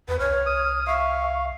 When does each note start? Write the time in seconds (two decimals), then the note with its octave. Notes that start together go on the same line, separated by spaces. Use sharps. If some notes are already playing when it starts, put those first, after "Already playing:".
0.08 E2 B4
0.19 C2 C#5 F6
0.46 D#6
0.87 E5 F5 C#6